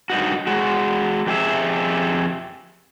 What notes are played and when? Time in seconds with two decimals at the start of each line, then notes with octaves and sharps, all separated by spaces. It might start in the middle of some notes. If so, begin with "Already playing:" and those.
0.10 G2 D#4 F#4
0.47 G#3 F#4
1.27 F2 G4 G#4 E5